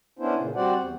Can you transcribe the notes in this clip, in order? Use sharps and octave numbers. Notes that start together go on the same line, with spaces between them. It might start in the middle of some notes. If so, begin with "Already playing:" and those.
B3 C#4 D4 E4 C5
A#2 C#3
G3 C4 F#4 C5 D5 F#5
E2